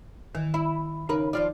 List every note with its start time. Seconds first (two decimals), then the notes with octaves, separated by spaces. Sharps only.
0.35 D#3 E3
0.54 E4
1.09 C#3 D#4 A#4 B4
1.33 F3 F4 D5